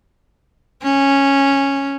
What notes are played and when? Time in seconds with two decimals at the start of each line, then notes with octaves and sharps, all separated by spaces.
0.84 C#4